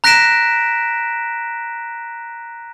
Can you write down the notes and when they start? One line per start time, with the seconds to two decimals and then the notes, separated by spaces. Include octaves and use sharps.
0.04 A#5 F#6 A#6 B6 D7 E7